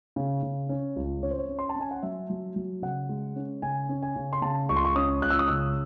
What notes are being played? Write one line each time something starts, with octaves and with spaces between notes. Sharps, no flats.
C#3
C#3
C#4
C#2
C#4 C#5
C5
C#5
C#4
C6
A5
C#4 G#5
F#5
F#3 E5
F#3
F#3
C#3 F#5
G#3
C#4
C#3 G#5
C#4
G#5
C#3
C6
C#3 A5
C#2 C#6
C6
C#6
C#4 D#6
C#2 F#6
E6
D#6
C#3 E6